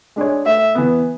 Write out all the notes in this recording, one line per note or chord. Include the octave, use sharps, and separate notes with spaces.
G#3 D4 G#4 C#5
A2 E5
E3 B3